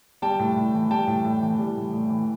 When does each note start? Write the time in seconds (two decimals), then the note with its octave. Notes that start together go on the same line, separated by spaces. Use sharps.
0.22 G3 G5 A5
0.39 A2
0.56 A2
0.74 E3
0.90 G3 G5 A5
1.07 A2
1.25 A2
1.42 E3
1.59 G3
1.77 A2
1.93 A2
2.10 E3